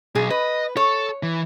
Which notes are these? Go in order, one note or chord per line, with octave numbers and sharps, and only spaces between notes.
B1 G#4
B4 D#5
A4 C#5
E3